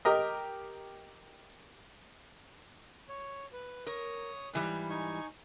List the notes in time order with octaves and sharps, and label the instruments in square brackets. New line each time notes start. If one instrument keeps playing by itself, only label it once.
[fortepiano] G4 A#4 D#5
[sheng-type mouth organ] C#5
B4
[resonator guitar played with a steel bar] A#4 [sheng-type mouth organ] C#5 D#6
[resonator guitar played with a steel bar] G#2 E3 G3
[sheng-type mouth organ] D#4 G#5 C#6